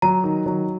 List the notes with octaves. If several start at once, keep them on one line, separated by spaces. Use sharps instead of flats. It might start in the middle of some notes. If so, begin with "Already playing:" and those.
F#3 A#5
D#3
F#3